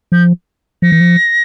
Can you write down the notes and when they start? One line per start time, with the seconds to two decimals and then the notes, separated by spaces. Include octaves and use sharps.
0.12 F3 G6
0.82 F3 A#6
0.92 E3
1.01 F3